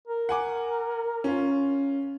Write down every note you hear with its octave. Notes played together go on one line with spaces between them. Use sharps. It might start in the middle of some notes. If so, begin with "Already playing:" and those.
A#4
F#5 G#5 D6
C#4 F4